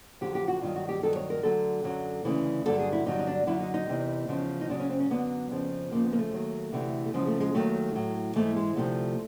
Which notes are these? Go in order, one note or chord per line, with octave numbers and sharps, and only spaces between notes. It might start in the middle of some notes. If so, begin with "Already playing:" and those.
F2 D3 F#3 G4
G4
F#4
G2 D#3 F#3 F4
F#4
G4
G2 D#3 F#3 A4
C#5
A#4
D2 D3 F#3 A4
F#2 D3 F#3
D2 C#3 E3
G2 D3 F#3 A4
G#4
E4
G2 D3 F#3 D#4
D#4
D4
F#2 D3 F#3 E4
D#4
D#4
E2 C3 E3
E2 C#3 F3
D#4
F#2 C#3 F#3 D4
C#4
C4
C#4
F#2 D3 F#3 B3
F2 C#3 F3
F2 C#3 F3 A#3
B3
A#3
A3
D#2 D#3 F#3
D2 C3 E3
A3
F#2 C#3 F3 G#3
A3
G#3
D#2 D#3 F#3 A3
A2 F#3
G#2 E3 A3
G#3
D2 C3 F3 A3